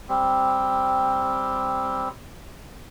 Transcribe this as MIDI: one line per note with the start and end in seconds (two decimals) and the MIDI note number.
0.09 2.09 55
0.09 2.09 60